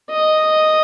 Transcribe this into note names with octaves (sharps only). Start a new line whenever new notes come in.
D#5